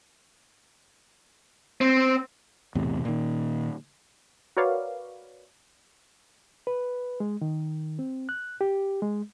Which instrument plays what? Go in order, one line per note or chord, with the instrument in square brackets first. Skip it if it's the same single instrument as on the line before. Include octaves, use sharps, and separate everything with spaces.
[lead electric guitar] C4
[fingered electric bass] B1 E2 A2 C3
A#2 D#3
[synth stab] F#4 A#4 B4 C#5 D5 F5
[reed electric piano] B4
G#3
D#3
C4
F#6
G4
G#3